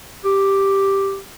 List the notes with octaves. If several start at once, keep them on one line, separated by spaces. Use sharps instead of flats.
G4